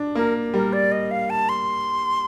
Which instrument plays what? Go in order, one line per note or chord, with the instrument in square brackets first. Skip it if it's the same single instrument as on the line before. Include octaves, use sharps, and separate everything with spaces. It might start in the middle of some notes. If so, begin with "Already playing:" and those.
Already playing: [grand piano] D4
[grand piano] A#3 [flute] A#4
[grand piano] G3 [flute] A#4
[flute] D5
D#5
F5
A5
C6